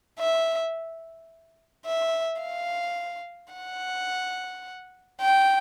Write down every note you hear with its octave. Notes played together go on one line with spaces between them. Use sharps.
E5
E5
F5
F#5
G5